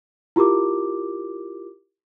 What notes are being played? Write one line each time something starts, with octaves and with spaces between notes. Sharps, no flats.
E4 F4 G4 A#4 D6